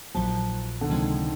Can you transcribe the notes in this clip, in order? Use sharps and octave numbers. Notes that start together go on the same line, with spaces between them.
A#1 A#2 F3 F#3
D3
C#2 C3 D#3 F3 G#3 C4